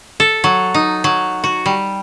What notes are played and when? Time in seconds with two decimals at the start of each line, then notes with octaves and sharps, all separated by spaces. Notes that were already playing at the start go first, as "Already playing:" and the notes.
0.20 A4
0.44 F#3
0.74 D#4
1.04 F#3
1.44 F#4
1.66 G3